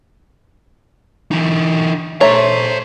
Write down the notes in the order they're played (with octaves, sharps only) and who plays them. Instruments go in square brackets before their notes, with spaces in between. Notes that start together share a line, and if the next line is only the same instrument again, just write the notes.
[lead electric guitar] E3 D#4
[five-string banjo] A3 C#5 [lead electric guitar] C5 A#5